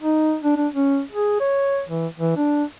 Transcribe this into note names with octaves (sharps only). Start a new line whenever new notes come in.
D#4
D4
D4
C#4
G#4
C#5
E3
E3
D4